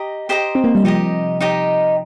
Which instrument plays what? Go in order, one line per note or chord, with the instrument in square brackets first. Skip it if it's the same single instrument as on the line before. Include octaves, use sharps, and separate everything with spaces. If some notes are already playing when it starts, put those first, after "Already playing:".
Already playing: [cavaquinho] G4 D#5 A#5
G4 C5 D#5 A#5
[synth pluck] C4
A#3
G3
[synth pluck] C3 F3 [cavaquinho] D#4 G4 D#5
[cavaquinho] D#4 G4 D#5